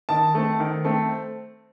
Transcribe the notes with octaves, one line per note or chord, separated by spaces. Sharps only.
D#3 A5
A3 C4
D#3
A3 C4